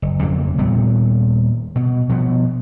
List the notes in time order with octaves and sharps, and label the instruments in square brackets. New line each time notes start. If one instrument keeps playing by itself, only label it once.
[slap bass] F#1
F2 C#3 A#3
D#1 A#2 G3 B3
B2
B2 F3 B3